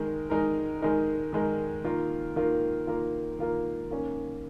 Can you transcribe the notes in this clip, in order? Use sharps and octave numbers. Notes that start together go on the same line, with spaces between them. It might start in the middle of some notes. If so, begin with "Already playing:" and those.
Already playing: D#3 G#3 D#4 A#4
D#3 G#3 D#4 A#4
D#3 G#3 D#4 A#4
D#3 G#3 D#4 A#4
D#3 A#3 F4 A#4
D#3 A#3 F4 A#4
D#3 A#3 F4 A#4
D#3 A#3 F4 A#4
D#3 A#3 C#4